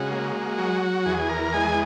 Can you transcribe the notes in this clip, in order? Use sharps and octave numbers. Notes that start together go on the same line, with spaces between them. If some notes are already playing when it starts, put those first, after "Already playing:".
Already playing: C#3 G#3 F#4
A#3
F#3
E2 G#4
A#4
G#3 G#5